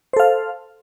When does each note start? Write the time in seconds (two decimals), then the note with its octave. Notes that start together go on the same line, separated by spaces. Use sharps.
0.13 C5
0.17 A4
0.20 F5